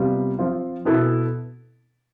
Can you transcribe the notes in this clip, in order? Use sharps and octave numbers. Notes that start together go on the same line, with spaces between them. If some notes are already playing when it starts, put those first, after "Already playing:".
Already playing: C3 G3 B3 F4
F3 C4 F4
B2 B3 E4 A4